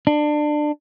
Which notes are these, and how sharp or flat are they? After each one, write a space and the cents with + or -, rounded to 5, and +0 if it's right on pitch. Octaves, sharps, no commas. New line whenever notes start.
D4 +25